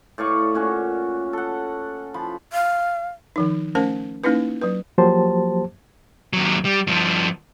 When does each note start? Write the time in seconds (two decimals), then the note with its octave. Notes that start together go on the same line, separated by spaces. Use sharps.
0.18 A2 D5 F5 C#6
0.54 A#2 C#4 F#4
1.33 A4 F#5
2.14 F3 B5
2.53 F5
3.36 D#3 F3 D#4
3.75 A3 C#4 A#4 C5 A5
4.24 A#3 C#4 D#4 E4 B4
4.61 F#3 B4
4.98 F3 F#3 A#3 G4 C5 A5
6.33 D#2 F#3
6.65 G3
6.87 G2 F3